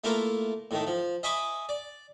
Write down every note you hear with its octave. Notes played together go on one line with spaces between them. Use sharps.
A3 A#3 E4 F4 A#4
A2 D#3 A3
F3
D#5 E5 G#5 B5 C#6 D6
D5